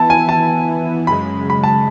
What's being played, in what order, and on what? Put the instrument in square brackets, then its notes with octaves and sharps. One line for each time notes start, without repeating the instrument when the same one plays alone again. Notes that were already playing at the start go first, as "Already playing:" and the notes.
Already playing: [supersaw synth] E3 B3 E4 [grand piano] A5
[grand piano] G#5
A5
[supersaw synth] F#2 C#3 G#3 [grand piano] B5
[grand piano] B5
A5